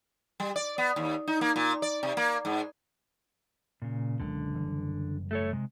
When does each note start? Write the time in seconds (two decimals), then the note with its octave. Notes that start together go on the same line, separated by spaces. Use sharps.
0.40 G3
0.56 D5
0.78 B3
0.96 D#2
1.27 D#4
1.41 A#3
1.56 A#2
1.82 D5
2.03 C3
2.17 A#3
2.45 G#2
3.82 A#2 C#3
4.20 F#1 C#2 A#2 D3
4.54 F#1 E3 G3
5.31 A3 A4 C#5
5.53 C3 G#3